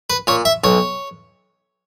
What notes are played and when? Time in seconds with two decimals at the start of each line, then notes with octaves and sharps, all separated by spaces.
0.10 B4
0.27 A#2 C#5
0.45 E5
0.64 B1 C#5